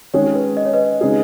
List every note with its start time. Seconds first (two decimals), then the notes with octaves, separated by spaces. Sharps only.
0.14 D#3 G#3 C#4 G#4 C#5
0.35 B4
0.57 D#5
0.65 C#5
0.74 B4 D#5
1.01 C#3 G#3 D#4 G#4